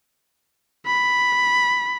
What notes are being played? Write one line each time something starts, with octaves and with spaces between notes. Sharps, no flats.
B5